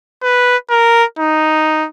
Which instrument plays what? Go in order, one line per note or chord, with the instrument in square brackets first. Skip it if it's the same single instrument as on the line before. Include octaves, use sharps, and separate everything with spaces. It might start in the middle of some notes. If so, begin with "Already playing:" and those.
[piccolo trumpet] B4
A#4
D#4